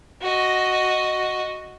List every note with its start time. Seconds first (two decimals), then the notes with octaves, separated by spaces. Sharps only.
0.21 F#4 D#5